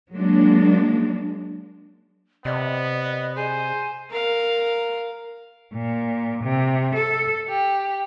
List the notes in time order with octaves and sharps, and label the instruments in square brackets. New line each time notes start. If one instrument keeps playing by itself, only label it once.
[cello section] F#3 G#3 A#3 D4
[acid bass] C3 [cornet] B3 [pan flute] D5 [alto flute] D#5
[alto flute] G#4 [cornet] C5 [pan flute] G#5
[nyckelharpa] A#4 F5
[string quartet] A#2
C3
A4
G4